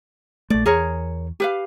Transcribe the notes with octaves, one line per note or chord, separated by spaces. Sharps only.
A#1 A3 D5
E2 G#4 A#4 C#5
G4 B4 F5